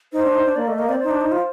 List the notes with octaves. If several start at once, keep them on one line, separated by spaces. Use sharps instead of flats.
D#4 C5
D4
D#4
D4
A#3 D5
A3 D#5
A#3 D#5
C4 D5
D#4 C5
D4
D#4
F4